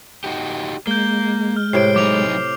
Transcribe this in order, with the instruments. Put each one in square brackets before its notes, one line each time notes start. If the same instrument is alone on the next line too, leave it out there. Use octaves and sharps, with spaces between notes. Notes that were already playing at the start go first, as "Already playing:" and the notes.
[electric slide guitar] D#4 F#4 G4
[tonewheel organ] G#3 [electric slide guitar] A#3 [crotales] G6 G7
[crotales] F6
[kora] A2 C3 E4 [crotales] C7 D7
[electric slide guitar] F#3 D#4 [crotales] D6 F7